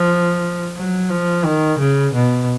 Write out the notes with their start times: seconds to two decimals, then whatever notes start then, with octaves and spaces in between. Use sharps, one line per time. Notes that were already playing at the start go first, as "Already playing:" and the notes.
Already playing: F3
0.76 F#3
1.10 F3
1.44 D#3
1.79 C#3
2.13 B2